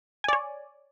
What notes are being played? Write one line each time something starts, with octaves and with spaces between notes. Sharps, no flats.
C#5 D5 G#5